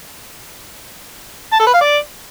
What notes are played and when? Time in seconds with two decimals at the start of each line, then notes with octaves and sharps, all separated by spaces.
1.53 A5
1.60 A4
1.67 B4
1.74 F5
1.81 D5